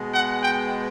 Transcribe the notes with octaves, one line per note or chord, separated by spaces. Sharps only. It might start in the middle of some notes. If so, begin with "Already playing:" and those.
Already playing: B2 G#3 B3
F#5
G5